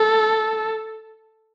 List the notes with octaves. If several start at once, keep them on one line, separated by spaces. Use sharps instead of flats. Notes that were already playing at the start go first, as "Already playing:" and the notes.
Already playing: A4